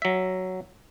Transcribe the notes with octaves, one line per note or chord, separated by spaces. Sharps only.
F#3 E5